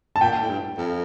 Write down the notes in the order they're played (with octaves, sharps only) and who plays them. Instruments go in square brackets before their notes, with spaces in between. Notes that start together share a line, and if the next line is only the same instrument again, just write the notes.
[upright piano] A5
[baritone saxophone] A#2 [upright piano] G5
[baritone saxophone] A2
G2
F2